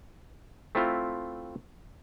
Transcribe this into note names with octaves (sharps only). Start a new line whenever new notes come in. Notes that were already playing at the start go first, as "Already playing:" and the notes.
A3 C4 E4 F4